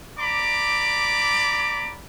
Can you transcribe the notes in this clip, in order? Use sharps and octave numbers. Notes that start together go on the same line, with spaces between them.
D5 A#5 B5 D6